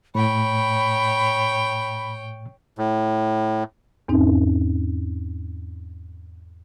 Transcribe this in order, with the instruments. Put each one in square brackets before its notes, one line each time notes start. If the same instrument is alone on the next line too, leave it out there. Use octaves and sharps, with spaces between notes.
[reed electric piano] A2 [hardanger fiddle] C#5 G5 [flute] B5
[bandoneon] A2
[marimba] E2 G#2 C4 C#4 D#4